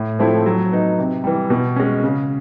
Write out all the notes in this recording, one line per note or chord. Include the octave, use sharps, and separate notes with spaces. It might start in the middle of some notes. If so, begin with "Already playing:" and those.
Already playing: A2
F3 A3 C4 E4
F#3
B3 D#4
C3
E3 G3
B2
G#3 C#4
C#3